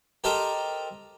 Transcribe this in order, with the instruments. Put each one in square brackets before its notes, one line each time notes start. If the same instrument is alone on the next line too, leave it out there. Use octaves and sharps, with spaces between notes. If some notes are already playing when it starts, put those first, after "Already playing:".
[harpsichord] G4 A4 A#4 C5 D#5 G5